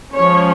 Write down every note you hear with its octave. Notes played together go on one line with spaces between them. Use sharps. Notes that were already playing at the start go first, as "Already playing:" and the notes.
F3 G#3 C#4 C#5